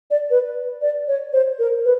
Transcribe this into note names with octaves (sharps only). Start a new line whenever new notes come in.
D5
B4
D5
C#5
C5
A#4
B4